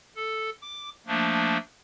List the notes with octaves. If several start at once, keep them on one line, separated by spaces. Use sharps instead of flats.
A4
D6
F3 A3 A#3 D4